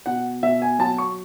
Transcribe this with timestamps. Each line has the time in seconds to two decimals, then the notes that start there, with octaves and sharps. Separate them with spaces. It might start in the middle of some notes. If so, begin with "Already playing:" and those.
0.06 B2 F#5
0.43 B2 E5
0.62 G#5
0.79 F#3 A5
0.98 C#6